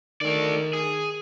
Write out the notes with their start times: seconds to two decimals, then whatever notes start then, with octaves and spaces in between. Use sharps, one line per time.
0.21 D#3 A3 D5
0.73 G#4